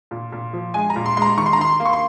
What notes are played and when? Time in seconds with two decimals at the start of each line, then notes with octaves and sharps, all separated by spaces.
0.11 A#2
0.32 A#2
0.53 F3
0.74 G#3 G#5
0.90 A#5
0.96 A#2
1.06 C6
1.17 G#3 C6
1.22 A#5
1.37 D#3 C#6
1.46 C6
1.53 A#5
1.59 D#3 C6
1.80 A#3
1.85 C#6
1.93 C6